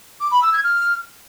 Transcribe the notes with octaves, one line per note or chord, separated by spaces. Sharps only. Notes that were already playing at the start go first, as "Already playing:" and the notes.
D6
B5
E6
G#6
F6